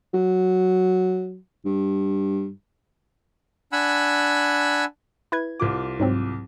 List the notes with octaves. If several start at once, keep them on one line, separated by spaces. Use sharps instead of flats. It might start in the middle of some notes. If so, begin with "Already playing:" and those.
F#3
G2
D4 F#5 G#5 B5 E6
E4 B4 G#6
C2 F4 D6
G#2 F#3 C4